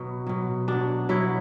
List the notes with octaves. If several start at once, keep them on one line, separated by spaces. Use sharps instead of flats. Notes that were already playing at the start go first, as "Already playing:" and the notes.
Already playing: B2 F#3 B3
B2 F#3
B2 F#3 D4
B2 F#3 E4